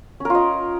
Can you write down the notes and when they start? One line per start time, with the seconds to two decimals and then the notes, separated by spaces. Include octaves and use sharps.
0.20 C#4
0.25 A#4
0.30 F4
0.35 D#5